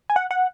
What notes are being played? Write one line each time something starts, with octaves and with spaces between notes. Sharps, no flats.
G#5
F#5
F#5